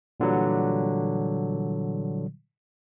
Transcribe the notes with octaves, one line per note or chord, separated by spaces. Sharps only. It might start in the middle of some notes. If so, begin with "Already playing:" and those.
A#2 D3 E3 F#3 G3